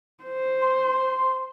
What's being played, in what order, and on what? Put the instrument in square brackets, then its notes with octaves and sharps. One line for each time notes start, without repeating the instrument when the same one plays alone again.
[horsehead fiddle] C5
[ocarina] C6